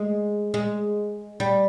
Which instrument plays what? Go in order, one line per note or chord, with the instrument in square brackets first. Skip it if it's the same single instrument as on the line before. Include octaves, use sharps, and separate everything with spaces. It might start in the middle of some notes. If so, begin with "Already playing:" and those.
Already playing: [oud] G#3
G#3
G3